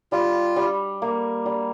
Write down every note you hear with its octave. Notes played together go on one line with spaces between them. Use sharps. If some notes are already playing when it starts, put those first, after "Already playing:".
G3 F4
G3
A#3
G3